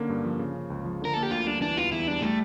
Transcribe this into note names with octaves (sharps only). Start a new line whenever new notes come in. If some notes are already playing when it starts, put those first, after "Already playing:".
Already playing: D3 A#3 C#4
G2
F3
C#3
C#4
C#2
F3
D3 A#4
A#3 A4
G4
D2 F4
G3 D4
E3 D4
E2 F4
E2 E4
G3 D4
G3 A3